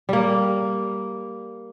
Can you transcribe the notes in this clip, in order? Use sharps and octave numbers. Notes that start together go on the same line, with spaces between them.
G3 A#3